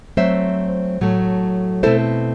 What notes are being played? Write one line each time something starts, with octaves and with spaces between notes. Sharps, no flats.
F#3 A3 C4 C5 E5
A2 F#3 A3
B2 A3 C4 E4 A4 C5